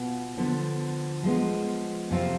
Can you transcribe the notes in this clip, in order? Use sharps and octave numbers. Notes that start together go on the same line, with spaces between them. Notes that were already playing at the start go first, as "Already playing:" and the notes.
Already playing: B2 B3 F4
D3 F3 B3
F3 G#3 B3
F2 C3 F3 C4 F4